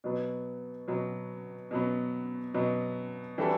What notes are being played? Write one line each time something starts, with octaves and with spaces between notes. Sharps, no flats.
B2 F#3 B3
B2 F#3 B3
B2 F#3 B3
B2 F#3 B3
E3 G3 D4 F#4 A4